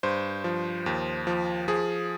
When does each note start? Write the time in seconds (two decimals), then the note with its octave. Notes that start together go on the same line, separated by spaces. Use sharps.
0.03 G2 C5
0.44 F3
0.86 D#2
1.27 F3
1.68 F3 G#4